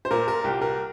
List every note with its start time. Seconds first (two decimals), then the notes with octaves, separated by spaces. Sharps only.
0.05 C5
0.11 A#2 A#4
0.28 A#4
0.44 C2 G4
0.61 A#4